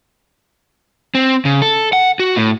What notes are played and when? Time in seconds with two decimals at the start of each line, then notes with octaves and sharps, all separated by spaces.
1.15 C4
1.45 C#3
1.62 A4
1.93 F#5
2.19 F#4
2.36 A2